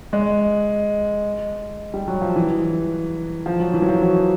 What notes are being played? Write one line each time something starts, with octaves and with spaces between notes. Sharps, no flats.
G#3
G3
F#3
F3
E3
F3
F#3
E3
F#3
F3
F#3